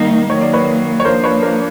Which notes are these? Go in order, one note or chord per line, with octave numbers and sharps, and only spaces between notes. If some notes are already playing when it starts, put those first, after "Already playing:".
Already playing: D#3 G3 A#3 D#4
D#3 F#3 A#3 C#5
D5
B4 C#5
C#5
F3 A#3 D4 A#4 C5
B4 C#5
A#4 C5